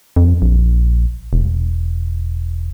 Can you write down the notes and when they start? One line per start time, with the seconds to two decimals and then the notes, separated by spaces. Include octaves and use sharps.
0.16 F2
0.42 A#1
1.33 E1